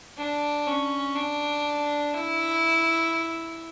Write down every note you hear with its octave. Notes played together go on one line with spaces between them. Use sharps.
D4
C#4
D4
E4